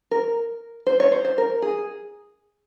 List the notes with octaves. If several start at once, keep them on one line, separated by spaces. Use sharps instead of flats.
A#4
C5
C#5
C5
C5
A#4
G#4